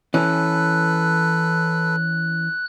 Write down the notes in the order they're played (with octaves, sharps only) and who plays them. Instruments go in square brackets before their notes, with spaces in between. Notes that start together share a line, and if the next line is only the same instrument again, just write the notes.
[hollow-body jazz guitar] E3 C#4 [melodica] A4 B4 [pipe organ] F#6